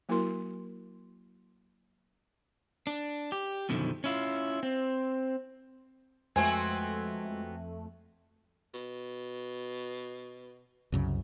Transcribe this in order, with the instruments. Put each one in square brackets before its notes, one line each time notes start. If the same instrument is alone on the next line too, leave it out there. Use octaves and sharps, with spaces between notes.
[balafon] F#3 A#3 E4 F#4 A#4 C6
[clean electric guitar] D4
G4
F#2 B2 D3 D#3 F3
C#4 E4 F4
C4
[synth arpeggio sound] F2 A3 [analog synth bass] G#3 [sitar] B3 C4 F#4 [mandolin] G#5
[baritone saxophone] B2
[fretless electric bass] C2 F#2 C#3